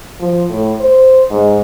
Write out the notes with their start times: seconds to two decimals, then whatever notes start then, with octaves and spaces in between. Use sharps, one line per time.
0.20 F3
0.50 A2
0.80 C5
1.30 G#2